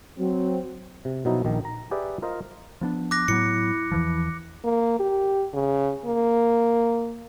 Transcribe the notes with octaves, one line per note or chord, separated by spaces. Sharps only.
F#3 C4
C3
B2 F3 F#3 D#4 E4
A#1 D#3
A#5
G4 G#4 B4 D5 E5 G5
F4 A#4 C5 D#5 F5
F3 B3 D4
D6 F#6 A#6
A2 F#3 B3 E4 C#7
E2 E3 F3
A#3
G4
C#3
A#3